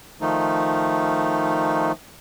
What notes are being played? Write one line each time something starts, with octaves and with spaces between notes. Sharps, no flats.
D#3 F3 A3 D#4